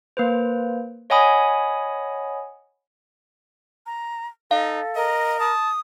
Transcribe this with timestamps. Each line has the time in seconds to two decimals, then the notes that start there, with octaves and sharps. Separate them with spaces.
0.17 A#3 B4 C5
1.10 C#5 D#5 F#5 G#5 B5 D#6
3.86 A#5
4.51 D#4 A4 F5
4.95 A#4 D#5
5.40 A5 D#6